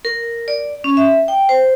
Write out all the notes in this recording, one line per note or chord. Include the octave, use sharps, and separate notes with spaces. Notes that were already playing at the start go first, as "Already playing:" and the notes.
A#4
D5
C#4
E5
G5
C5